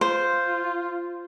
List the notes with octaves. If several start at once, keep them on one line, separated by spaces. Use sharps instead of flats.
F4 C5